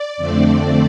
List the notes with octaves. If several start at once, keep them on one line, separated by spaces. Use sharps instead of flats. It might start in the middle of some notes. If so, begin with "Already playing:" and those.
Already playing: D5
F2 D3 A3 C4